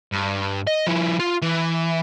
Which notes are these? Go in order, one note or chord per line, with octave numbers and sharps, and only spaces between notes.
G2
D#5
F3 E4
F4
E3